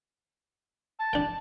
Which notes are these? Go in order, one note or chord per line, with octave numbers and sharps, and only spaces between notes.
A5
D4 G5